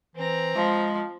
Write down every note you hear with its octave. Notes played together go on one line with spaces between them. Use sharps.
E3 C4 A#5
F3 G#3